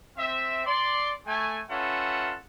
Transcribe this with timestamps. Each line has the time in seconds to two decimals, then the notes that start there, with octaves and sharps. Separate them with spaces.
0.17 C4 E5
0.66 D5 C6
1.26 A3 G#5
1.70 C#4 F4 A4 B4 E5 F#5